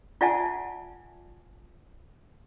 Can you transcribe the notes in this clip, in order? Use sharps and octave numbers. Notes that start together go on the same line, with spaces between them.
F4 D5 E5 F#5 G#5 A5